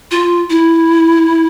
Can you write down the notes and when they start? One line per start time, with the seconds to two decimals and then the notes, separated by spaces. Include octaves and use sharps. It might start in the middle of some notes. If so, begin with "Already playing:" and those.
0.11 F4
0.50 E4